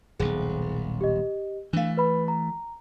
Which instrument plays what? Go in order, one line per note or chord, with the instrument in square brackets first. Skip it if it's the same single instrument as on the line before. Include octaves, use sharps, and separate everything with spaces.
[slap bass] D#1 B1 [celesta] G#4
[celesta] G4 D#5
[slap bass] E3 A3 [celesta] D4 F5
[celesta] B4 B5
A#5